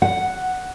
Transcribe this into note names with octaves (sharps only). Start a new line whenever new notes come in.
F#5